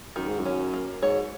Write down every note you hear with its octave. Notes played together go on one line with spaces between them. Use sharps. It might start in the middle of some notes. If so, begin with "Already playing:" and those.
F#2 D#3
G#2
F#2
C#4
A#3
G#2 C#5